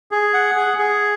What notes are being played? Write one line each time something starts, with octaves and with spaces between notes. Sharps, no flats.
G#4
F#5
G#4
G#4